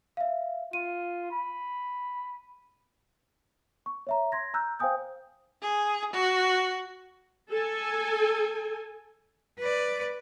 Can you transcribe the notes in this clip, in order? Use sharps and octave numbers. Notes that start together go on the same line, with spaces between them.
E5 F5
F4 D#7
B5
C#6
C#5 E5 A#5
C6 G#6 A#6
A#5 E6 F#6 G6
C5 F5 G5 G#5 D#6 G6
G#4
F#4
A4 G#5
B4 D5